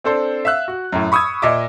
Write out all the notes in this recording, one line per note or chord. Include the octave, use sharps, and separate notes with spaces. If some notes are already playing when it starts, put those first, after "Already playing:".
C4 D4 A4 C5
E5 F5 E6 F#6
F#4
F#2 A2
B5 C#6 D#6 E6 G#6
A#2 D#5 E5 D6